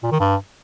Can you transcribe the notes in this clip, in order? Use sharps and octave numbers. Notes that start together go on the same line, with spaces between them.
A#2
D#3
G2